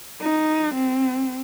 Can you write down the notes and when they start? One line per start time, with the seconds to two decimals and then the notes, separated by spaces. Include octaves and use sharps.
0.21 D#4
0.75 C4